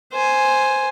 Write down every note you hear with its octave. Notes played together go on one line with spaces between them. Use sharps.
C5 G#5